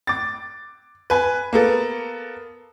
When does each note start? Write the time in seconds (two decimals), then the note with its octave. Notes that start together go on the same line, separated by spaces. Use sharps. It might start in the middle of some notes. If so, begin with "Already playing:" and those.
0.07 D6 A6
1.10 B4 G#5
1.53 A#3 B3 A4